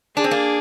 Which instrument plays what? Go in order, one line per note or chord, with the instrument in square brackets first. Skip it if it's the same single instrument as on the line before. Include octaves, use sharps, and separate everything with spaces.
[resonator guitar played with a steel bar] D4 [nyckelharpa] G#4
[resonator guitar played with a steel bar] C4
A#3 D4